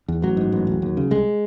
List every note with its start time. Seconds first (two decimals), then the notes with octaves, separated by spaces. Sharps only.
0.08 E2
0.22 A1 F#3
0.37 G#2
0.52 A1
0.67 E1
0.82 D#2
0.97 C#3
1.11 C2 G#3